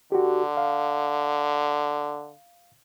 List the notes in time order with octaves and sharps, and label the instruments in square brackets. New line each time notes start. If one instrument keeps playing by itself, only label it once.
[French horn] D3 [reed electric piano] F#4 G4
[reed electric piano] F5